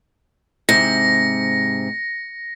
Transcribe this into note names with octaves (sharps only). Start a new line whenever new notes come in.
G#2 C3 A#6 C#7